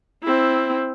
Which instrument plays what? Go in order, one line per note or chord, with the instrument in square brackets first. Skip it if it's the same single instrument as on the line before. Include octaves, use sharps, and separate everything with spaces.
[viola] C4 E4